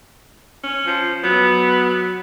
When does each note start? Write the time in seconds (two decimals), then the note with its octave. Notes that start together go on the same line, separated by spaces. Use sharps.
0.64 C#4
0.86 F3
1.24 F#3 B3